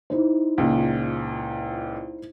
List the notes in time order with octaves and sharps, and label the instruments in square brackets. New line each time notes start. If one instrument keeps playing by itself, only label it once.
[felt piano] D#4 E4 C5
[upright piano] C#2 A#2